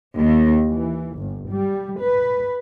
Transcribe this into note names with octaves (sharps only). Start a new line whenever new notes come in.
D#2
E3
G1
G3
B4